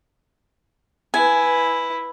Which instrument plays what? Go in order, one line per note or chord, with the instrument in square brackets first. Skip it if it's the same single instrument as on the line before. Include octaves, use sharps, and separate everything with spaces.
[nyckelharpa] E4 B4 [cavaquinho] G#5